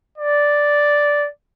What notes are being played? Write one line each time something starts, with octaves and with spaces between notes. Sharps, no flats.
D5